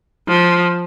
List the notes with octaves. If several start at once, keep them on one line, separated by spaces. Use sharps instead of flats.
F3